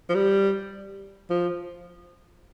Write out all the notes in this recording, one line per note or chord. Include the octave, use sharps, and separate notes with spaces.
F3
G3
F3